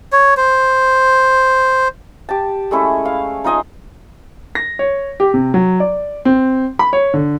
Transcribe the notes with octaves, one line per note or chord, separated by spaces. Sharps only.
C#5
C5
G4 A5
G#3 A3 C#4 E4
F5
D#4 F4 D#5 G#5
A#6
C#5
G4
C3
F#3
D5
C4
B5
C#5
D3